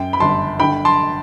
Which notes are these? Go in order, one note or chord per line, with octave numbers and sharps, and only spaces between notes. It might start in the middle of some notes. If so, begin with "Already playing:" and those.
Already playing: F#2 G5
B5
G1 A5 C6
D3 G5 B5
A5 C6